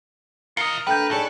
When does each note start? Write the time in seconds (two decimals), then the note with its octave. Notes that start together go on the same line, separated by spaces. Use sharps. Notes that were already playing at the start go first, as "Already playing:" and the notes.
0.57 F4 A#4 D#5 A#5 C#7
0.87 D3 A3 B4 G5 G6
1.11 D#4 G#4 A4 D5 B5 C#6 F#6